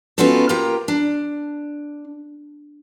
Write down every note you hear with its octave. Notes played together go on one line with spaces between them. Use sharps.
B3 C#4 D#4 F4 F#4 A4
A#3 F4 G4 A#4 G5 A#5
D4